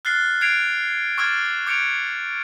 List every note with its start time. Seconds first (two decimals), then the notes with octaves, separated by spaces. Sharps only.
0.05 F6 F#6 A6 C7 G7
0.41 F#6 G#6 C7 D7 F7
1.18 C#6 D6 E6 F6 G#6 A6
1.67 D6 G6 C#7 D7 F7